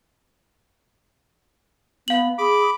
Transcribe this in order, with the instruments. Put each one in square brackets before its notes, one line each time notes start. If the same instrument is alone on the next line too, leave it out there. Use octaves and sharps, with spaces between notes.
[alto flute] B3 [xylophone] F5 F#7
[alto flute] G#4 [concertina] B5 D6